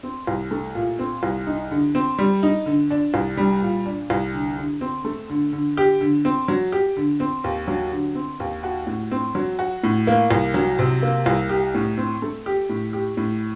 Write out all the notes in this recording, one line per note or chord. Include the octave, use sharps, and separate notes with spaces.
C4
C2
A3
A#2
C4
C2
D#4
D3
C4
G3
D#4
D3
D4
C2
G3
A#2
D4
C2
D3
D3
C4
A3
D3
D3
G4
D3
C4
F#3
G4
D3
C4
D#2
F#3
D3
C4
D#2
F#4
A2
C4
F#3
F#4
A2
A#3
C2
F#3
C3
A#3
C2
G4
A2
C4
A3
G4
A2
G4
A2